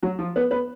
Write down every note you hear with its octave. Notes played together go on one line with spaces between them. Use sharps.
F#3 F#4
F3 F4
B3 B4
B3 B4